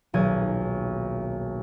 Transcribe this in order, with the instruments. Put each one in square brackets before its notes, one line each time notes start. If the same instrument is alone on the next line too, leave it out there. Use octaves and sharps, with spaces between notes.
[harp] D#1 B1 G#4 G#6